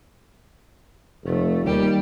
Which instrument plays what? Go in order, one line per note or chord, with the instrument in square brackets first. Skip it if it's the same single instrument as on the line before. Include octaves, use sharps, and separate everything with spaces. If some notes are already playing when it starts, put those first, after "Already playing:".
[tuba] F1 [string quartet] A3
[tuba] D#2 [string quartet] G3 G4